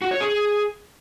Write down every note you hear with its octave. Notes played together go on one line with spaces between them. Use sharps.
F#4
C#5
G#4